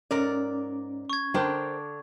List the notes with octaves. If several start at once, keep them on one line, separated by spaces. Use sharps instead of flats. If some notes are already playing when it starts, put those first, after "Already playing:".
G#2 C#4 A#4 D5
C#6 G#6
D3 D4 A#4 C5 G5